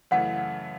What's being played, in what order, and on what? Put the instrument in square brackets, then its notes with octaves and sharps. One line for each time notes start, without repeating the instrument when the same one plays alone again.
[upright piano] F#2 C#3 E3 A3 [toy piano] F#5